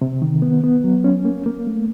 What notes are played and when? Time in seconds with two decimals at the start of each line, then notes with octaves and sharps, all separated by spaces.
0.01 C3
0.22 D#3
0.42 B3
0.64 B3
0.84 F#3
1.04 C#4
1.25 A#3
1.46 A#3
1.67 A3